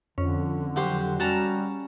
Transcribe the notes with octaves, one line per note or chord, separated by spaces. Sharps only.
F2 D3 C#4
F#3 F#4 G4 C5
G3 C#4 F#4 A5 A#5